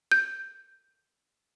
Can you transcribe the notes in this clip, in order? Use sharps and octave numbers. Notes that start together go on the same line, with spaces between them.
G6